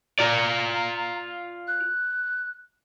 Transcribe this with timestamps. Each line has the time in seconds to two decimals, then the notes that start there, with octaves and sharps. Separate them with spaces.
0.19 F4 D5 A#5
1.68 F#6